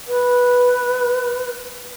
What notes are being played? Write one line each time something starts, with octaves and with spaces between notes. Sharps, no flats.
B4